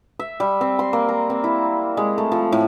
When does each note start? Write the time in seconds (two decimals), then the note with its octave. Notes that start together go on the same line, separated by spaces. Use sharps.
0.19 E5
0.40 G3
0.61 C4
0.79 C6
0.93 A#3
1.09 A#5
1.30 C4
1.44 E4
1.97 G#3
2.18 A3
2.32 F3
2.52 A2